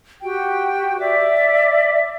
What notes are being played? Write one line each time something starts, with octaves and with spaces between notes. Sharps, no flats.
F#4 G4 G5
D5 E5 D6